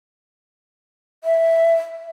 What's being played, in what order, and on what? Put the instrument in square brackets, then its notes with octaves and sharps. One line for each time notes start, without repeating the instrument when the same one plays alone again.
[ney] E5